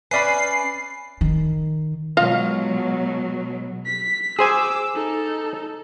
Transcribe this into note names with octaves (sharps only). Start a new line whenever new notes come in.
C#4 B4 D5 E5 G#5 B5 C7
D#3
B2 F#3 G#3 F4 D#5 F5
B6
G#4 C5 G#5 D6 E6
D#4 A4